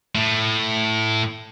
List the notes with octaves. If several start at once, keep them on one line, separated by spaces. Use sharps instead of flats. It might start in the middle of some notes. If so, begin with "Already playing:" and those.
A2